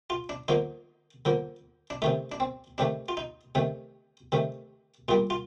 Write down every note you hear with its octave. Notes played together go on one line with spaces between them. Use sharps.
F4
D4
D3 F3 A#3 D#4
D3 F3 A#3
D4
C3 D#3 A3 D#4
D4
C4
C3 D#3 A3 D4
F4
D#4
C3 D#3 A3
C3 D#3 A3
A#2 G3 A#3 F4
F4